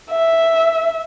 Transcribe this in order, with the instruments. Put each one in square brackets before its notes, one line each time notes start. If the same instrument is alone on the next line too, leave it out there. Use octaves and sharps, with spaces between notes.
[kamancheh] E5